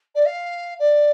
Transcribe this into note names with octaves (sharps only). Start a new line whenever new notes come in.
D5
F5
D5